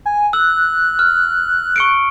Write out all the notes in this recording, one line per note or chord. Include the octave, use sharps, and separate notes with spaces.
G#5
E6 F#6
F6
C#6 C#7 D7